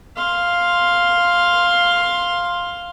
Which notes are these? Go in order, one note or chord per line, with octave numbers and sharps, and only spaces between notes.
F5 C6